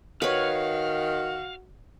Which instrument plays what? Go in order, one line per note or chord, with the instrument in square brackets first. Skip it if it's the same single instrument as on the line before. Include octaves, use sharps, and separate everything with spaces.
[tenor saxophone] D#3 [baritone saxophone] F#4 [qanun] B4 C#5 [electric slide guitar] F5